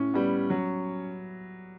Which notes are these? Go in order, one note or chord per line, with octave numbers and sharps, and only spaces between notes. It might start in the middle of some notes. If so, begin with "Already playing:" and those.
Already playing: A2 C#4
G3 B3
F#3